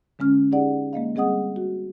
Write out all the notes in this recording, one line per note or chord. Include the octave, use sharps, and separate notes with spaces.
D3 G#3 C#4 F6
D#4 G4 G#4 D5 F#5
G#3 A#3 D#5 F5
G3 C4 G#4 D#5 F#5 D#6
F#4